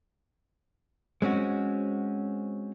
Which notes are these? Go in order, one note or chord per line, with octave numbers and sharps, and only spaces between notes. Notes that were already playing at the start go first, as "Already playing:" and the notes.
G#3 C4 C#4 F#4